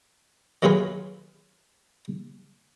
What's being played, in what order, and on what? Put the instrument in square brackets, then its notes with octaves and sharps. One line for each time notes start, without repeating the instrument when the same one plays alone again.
[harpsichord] D#3 F#3 F4 G#4 B4